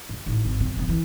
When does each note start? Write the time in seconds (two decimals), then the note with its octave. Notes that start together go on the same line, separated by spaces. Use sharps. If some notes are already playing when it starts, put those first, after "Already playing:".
0.09 G2
0.26 A1 D#4
0.45 G#1
0.60 F#2 C3
0.77 C3 F#3
0.89 E3